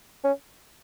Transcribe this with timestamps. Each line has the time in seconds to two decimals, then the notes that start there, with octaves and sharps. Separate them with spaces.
0.24 C#4